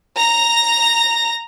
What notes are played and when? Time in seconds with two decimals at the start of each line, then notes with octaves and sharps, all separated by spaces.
0.17 A#5 A#6